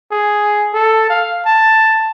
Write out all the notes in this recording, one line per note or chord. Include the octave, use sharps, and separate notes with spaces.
G#4
A4
F5
A5